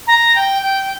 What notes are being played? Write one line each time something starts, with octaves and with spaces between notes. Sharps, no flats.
A#5
G5
G5